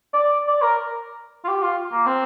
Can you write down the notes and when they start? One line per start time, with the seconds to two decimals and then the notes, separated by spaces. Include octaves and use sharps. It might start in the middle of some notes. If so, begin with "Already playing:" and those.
0.13 D5
0.47 D5
0.62 A#4
1.45 F4
1.48 G4
1.63 F4
1.92 A#3
2.06 C4